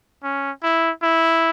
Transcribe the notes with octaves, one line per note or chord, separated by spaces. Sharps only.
C#4
E4
E4